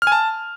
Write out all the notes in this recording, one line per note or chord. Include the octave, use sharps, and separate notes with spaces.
F6
G#5
A5